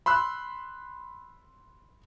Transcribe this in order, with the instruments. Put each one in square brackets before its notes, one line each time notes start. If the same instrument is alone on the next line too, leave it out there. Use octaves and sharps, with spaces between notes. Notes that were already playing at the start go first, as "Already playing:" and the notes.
[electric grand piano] B5 C6 E6 F#6